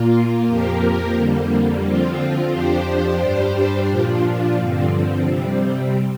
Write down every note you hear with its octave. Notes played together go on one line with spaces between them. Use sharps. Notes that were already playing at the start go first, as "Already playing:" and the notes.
Already playing: A#2 A#3 F4
F2 F3 A#3 G4 A#4
F2 D3 G3 A#3
D3 F3 C4 F4
F2 F3 D4 G4 C5
G2 G3 D4 G4 C5
A#2 F3 D4 F4
G2 D3 F3 C4
C3 G3 C4